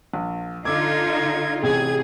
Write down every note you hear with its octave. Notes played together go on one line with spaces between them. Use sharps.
A#1
D3 D#4 F4 D6 E6 G#6
A1 C3 G#4 G#6